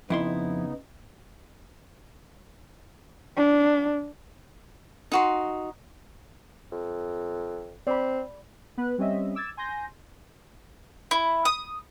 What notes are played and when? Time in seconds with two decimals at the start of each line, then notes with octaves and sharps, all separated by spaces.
0.10 F2 C#3 B3 D#4 E4 C6
3.37 D4
5.12 D#4 F#4 C6
6.72 F2
7.87 C4 D5 B5
8.78 B3 B4 F#6
8.98 G3 C4 C#4 D#5 E5
9.35 D6 E6 G#6 A6
9.57 G#5 C6 G6 A#6
11.11 E4
11.45 D#6